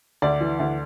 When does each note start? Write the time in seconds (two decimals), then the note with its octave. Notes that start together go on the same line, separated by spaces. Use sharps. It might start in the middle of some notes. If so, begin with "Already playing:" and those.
0.22 D2 D5
0.41 E3
0.60 D2